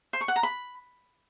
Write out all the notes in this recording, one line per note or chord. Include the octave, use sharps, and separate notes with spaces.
C5
C#6
F#5
A#5
B5